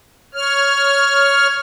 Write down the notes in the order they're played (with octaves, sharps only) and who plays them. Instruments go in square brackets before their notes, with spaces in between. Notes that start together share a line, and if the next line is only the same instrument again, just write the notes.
[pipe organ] C#5 F6